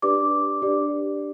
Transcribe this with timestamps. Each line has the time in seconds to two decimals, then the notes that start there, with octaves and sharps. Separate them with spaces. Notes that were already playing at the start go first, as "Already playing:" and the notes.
0.02 D4 G4 B4 D5 D6
0.62 D4 G4 D5